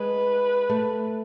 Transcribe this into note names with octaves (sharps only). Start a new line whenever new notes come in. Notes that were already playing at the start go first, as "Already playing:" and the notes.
Already playing: G#3 B4
A3